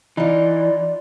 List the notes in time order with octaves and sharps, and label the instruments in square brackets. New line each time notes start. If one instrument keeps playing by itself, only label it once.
[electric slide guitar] E3 [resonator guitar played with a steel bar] D#4 F4 [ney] D5